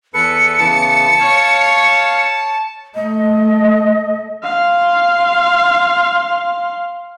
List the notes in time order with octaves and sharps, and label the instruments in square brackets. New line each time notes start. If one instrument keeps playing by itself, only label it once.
[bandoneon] E2 A4 B4 [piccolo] C#7
[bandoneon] C#3 E3 B3 [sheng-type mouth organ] A5
[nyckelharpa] C#5 [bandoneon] F5
[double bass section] A3 [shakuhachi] D#5
[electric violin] F5 C6